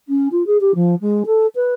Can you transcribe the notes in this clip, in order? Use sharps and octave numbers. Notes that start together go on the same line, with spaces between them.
C#4
F4
G#4
G4
F3
G#3
A4
B4